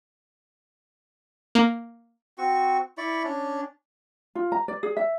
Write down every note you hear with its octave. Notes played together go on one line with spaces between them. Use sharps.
A#3
C4 F#4 C#6
E4 D5 B5 C#6
C#4 D4
F4
A#5
D5
G#4
E5